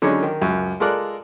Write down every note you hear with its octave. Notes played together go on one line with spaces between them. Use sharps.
D3 F#3 G#3 C#4 D#4 C#5
D#3
C#2 F#2
G#3 F4 A4 A#4 D5 F#6